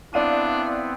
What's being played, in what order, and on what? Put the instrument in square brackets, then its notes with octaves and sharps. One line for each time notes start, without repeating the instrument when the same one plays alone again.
[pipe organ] B3 C4 [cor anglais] D4 [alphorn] E4 [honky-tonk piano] D5 F5 D#7